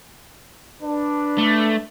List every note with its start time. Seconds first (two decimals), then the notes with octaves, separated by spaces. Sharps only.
0.83 D4 B4
1.38 A3